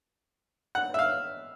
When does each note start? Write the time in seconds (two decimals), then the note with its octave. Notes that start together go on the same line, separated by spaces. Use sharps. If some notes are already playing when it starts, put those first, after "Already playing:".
0.75 F#5
0.94 E5
0.99 F5